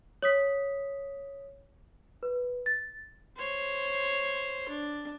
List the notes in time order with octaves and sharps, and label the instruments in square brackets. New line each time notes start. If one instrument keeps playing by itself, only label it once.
[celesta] C#5 D#6 B6
B4
A6
[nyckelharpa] C5 C#5
D4